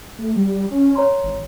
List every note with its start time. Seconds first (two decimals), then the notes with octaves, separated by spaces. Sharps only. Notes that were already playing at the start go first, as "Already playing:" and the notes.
0.18 A3
0.36 G3
0.71 C#4
0.95 C#5 A#5 C6
1.24 G#1